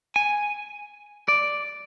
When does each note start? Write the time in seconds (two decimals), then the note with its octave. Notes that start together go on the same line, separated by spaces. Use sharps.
0.16 G#5
1.28 D5